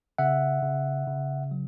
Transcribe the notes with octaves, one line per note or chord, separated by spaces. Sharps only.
C#3 E5 F#5
C#3
C#3
F#3